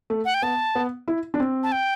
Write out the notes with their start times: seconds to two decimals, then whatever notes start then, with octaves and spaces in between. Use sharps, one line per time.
0.10 A3
0.25 F#5
0.34 G5
0.42 B3 A5
0.75 B3
1.08 E4
1.34 D4
1.40 C4
1.63 A5
1.72 G5